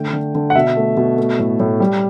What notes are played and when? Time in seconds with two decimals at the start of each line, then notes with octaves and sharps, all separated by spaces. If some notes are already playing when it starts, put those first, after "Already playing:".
Already playing: D3 A3 G5
0.13 D3
0.35 D3
0.50 F#5
0.55 B2 E5
0.77 A3
0.97 B2
1.18 A3
1.39 A2
1.60 A2
1.80 G3